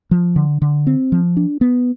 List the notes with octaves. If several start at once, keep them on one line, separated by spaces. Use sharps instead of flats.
F3
D3
D3
C4
F3
D4
B3